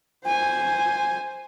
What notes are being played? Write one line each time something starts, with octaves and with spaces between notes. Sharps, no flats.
C5 G#5